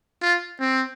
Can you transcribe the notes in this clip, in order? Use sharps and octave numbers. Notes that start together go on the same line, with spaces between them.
F4
C4